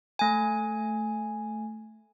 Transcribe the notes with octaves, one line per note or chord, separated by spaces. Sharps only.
A3 G#5